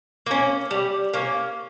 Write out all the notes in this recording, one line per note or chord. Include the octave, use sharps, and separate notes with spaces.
A#3 C#4
G3
A#3 C#4